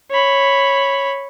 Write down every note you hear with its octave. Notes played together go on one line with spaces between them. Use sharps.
C#5 B5